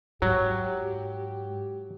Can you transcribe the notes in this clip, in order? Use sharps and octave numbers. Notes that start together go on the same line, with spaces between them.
G#2 F#3 G4